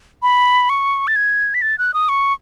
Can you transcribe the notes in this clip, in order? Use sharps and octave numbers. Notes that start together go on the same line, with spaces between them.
B5
C#6
A6
G#6
B6
A6
F#6
D#6
C#6